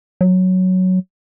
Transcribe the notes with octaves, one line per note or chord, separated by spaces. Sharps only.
F#3